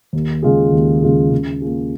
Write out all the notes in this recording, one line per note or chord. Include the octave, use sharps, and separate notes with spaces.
D#2
C#3 G#3 F4 G#4
D#2
C#3 G#3 F4 G#4
C#3
A#3 F4 G#4